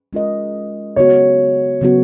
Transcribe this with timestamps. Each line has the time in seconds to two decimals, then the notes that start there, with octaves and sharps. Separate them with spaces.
0.13 G#3 C#4 F4 A#4 D#5
0.96 C#3 F#3 B3 F#4 C#5
1.81 C#3 F#3 B3 F#4